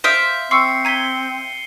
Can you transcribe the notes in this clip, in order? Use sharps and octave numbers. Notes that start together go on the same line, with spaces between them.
C5 E5 F5 C6 D#6 D7
C4 C6 C#6 E6 C7 C#7
A#5 G#6 B6 D#7 G7